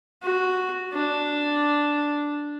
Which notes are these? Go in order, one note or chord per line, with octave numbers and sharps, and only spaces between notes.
F#4
D4